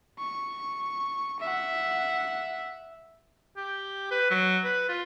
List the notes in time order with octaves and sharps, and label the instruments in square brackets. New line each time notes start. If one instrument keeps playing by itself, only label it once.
[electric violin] C#6
E5 F#5
[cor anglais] G4
B4
F#3
B4
F4